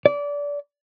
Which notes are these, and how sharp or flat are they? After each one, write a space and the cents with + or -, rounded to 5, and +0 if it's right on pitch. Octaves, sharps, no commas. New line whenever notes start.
D5 -25